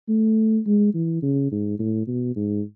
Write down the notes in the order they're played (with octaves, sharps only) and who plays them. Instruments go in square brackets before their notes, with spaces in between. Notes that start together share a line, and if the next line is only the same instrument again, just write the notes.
[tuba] A3
G#3
E3
C#3
G#2
A2
B2
G#2